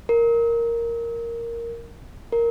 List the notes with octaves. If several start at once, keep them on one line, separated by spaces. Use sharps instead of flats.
A#4
A#4